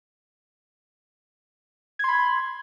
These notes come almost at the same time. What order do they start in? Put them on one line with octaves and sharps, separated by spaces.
G#6 C6 B5